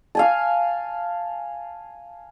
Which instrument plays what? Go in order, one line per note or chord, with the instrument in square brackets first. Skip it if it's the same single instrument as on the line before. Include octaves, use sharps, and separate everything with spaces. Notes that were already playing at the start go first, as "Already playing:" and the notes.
[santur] F5 G#5 A5